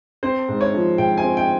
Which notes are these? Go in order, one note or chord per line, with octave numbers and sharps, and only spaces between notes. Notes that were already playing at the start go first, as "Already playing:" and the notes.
C4 C5
G#2
C#5
F3
G#2 G5
G#5
C4
G5